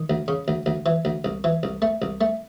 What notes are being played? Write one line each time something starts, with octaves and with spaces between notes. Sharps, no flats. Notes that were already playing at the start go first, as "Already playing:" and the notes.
Already playing: D#3
D2
C#3
D2
D2
E3
D2
C2
E3
C2
A3
C2
A3